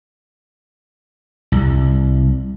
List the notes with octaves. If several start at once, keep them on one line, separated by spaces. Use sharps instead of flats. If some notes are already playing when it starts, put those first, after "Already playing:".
C2